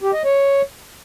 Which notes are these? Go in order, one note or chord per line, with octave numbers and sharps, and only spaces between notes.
G4
D#5
C#5